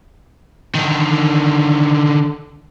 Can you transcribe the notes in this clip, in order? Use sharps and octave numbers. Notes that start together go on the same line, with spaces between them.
D3 D#3